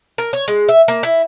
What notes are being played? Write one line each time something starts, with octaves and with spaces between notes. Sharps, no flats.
A#4
C#5
G#3
E5
A#3
E4